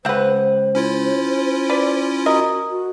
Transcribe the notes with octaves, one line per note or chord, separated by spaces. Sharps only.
C#2 C4 B4 C5 F#5
C#4 E4 F4
B4 D5
F#4 A#4 D#5
F#4